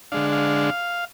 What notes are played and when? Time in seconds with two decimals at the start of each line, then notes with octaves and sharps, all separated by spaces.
0.12 D3 G#3 D4 F5
0.32 F5